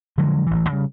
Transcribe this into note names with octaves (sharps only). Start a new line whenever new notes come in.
D3 F3 F#3 G#3
A1 E3
C#3 G3